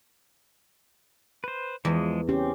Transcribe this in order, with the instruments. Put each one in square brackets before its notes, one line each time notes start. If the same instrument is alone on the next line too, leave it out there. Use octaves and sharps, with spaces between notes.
[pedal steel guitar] B4 C5
[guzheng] E2 [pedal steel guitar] F3 G#3
[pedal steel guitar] C4 [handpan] C#4 G4